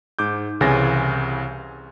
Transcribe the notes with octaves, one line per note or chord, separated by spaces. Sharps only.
G#2 D6 G6
C2 C#3 E3 G#5 A6 A#6